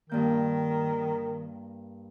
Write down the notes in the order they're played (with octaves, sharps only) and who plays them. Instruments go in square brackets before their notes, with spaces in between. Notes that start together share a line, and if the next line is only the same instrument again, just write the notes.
[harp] G2 A#3 G6 [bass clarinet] D#3